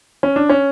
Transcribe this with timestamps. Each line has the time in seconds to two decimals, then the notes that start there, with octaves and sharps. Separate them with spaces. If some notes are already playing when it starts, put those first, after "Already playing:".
0.23 C#4
0.36 D4
0.49 C#4